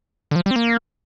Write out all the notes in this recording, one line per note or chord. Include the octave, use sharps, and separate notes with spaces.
D3
F3
G3
C4
A#3